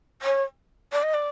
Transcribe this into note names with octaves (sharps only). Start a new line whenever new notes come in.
C#5
D5
D#5
D5